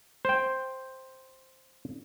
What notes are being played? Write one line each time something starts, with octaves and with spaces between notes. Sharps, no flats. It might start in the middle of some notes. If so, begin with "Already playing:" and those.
C5 G5